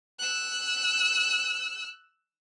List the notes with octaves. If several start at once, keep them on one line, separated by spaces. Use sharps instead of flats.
E6 F#6